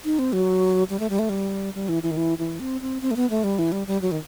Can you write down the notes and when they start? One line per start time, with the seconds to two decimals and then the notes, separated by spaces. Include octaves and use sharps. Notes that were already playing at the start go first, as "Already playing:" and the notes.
0.05 D#4
0.19 C4
0.33 F#3
0.90 G3
1.00 A3
1.10 G3
1.19 A3
1.29 G3
1.75 G3
1.89 E3
2.03 E3
2.11 D#3
2.17 E3
2.38 E3
2.60 C4
2.81 C4
3.02 C4
3.11 A3
3.16 B3
3.30 A3
3.44 G3
3.59 E3
3.72 G3
3.87 G3
4.02 F#3
4.11 D#3